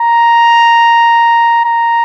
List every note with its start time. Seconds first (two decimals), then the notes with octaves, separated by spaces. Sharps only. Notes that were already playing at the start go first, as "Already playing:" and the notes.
Already playing: A#5
1.65 A#5